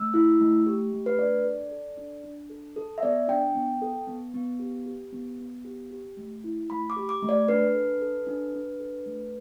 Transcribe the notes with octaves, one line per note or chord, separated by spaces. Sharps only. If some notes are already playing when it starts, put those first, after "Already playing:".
Already playing: A3 E6
E4
A3
G4
A3
B4
D4 D5
A4
A4
D4
D4
A4
A4
E5
B3 D5
D4 G5
B3
A4
B3
B3
G4
G4
B3
B3
G4
G4
A3
E4
A3 B5
D6
G4
D6
A3
D5
D4 B4
A4
A4
D4
D4
A4
A3